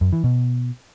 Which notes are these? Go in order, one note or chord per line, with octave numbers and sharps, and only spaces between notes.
F#2
E3
B2